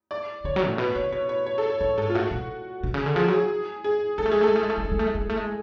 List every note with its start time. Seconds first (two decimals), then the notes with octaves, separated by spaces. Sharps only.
0.11 D5
0.44 D3 C#5
0.56 F#3
0.67 A2
0.78 B2 B4
0.95 C#3 C#5
1.12 B2 C#5
1.29 C#5
1.46 C#5
1.58 A4
1.70 C#5
1.81 A2 C#5
1.98 G#2 A4
2.09 F4
2.15 A2 F#4
2.31 B2
2.83 B2
2.94 C#3
3.06 D3
3.16 F3 G#4
3.28 F#3 G#4
3.84 G#4
4.18 G#3 A4
4.26 A3
4.31 G#3 G#4
4.41 A3 A4
4.48 G#3
4.56 A3
4.63 G#3
4.70 A3
4.78 G#3
4.84 A3
4.92 G#3
4.99 A3
5.07 G#3
5.15 A3
5.21 G#3
5.30 A3
5.37 G#3